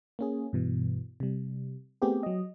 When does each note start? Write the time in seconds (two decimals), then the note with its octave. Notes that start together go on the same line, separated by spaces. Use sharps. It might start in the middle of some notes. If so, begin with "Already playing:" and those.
0.19 A#3 C#4 G#4
0.53 G2 B2 E3
1.20 C3 G3
2.02 A3 B3 C4 G4 G#4
2.23 F#3 D#5